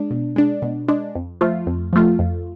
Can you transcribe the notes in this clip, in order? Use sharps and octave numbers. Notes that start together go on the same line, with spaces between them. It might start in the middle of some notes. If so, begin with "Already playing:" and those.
Already playing: G#3 D4
B2
G#3 D4
B2
G#3 D4
F2
F3 A3 F4
F2
F3 A3 F4
F2